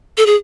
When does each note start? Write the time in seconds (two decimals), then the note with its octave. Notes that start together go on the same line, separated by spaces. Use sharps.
0.17 A4
0.26 G#4